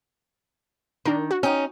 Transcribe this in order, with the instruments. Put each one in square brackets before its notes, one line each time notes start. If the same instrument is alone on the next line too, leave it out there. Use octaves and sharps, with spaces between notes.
[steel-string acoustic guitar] D#3 [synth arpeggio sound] D4 A#4
[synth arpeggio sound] F#4
[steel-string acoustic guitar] C#4 D#4 [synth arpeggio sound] G5 D#6